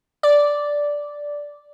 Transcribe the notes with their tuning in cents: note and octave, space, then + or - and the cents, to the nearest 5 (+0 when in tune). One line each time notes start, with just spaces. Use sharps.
D5 -5